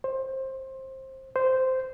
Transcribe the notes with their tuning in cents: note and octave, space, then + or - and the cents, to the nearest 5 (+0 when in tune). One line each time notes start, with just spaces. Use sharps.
C5 +20
C5 -10